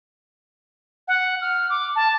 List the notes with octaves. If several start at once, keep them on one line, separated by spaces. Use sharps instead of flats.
F#5
F6
D6
A5